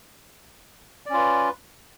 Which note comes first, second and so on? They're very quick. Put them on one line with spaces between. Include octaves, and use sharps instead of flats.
D5 C#4 F4 B4